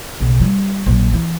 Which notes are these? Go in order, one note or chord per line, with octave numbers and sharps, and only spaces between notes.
B1 C#3
F3 G3
A#1 F#3
E3